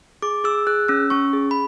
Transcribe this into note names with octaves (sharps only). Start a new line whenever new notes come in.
G#4 D6
G#4 E6
G#4 F#6
C#4 E6
C#4 C#6
G#4
B5